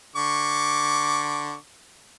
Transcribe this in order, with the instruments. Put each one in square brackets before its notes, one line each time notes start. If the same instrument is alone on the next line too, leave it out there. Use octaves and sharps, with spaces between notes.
[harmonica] D3 C#6 D6